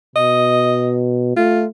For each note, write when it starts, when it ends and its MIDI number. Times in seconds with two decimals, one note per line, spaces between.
0.16 1.35 47
0.16 0.99 75
1.36 1.66 57
1.36 1.63 65